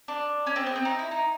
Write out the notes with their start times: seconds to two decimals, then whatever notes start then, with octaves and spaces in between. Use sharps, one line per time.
0.08 D4
0.46 C#4
0.56 C4
0.66 B3
0.76 C4
0.85 D#4
0.99 E4
1.11 D#4